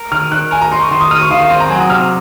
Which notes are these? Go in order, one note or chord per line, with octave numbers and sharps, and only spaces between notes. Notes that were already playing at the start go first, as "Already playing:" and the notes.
Already playing: A#4
D#3 F6
D#3 F#6
A#4 G#5
A#5
D#4 C6
C#6
D#3 C6
D#6
D#4 F6
C#6
D#3 F5
F5
C4 C6
A#5
F#3 G#5
D#6
C3 F6